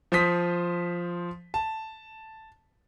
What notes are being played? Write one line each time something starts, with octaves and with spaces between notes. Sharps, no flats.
F3 C5 C6 D#6 B6
A5